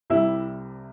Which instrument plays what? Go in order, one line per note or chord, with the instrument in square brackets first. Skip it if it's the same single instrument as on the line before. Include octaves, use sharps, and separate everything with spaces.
[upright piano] C2 C3 G3 E4 E5